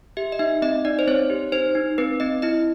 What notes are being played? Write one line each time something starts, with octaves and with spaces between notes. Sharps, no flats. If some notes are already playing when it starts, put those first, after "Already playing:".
G4 E5
D#5
D#4 E5
C4 D#5
D#4 D5
C5
C4 C#5
G4
D#4 C5
D#4
C4 B4
C4 D#5
E4 D#5